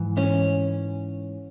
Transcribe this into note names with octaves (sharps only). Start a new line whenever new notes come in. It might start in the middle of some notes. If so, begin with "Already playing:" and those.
Already playing: G#2 E3
C#4